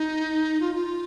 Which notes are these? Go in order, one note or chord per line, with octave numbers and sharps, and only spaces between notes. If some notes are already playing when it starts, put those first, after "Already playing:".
Already playing: D#4
F4
F4